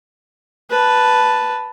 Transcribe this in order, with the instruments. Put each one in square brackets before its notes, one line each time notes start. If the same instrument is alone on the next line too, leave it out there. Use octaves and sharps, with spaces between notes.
[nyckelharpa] B4 A5